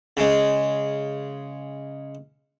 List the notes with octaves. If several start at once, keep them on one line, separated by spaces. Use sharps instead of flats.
C#3 G#3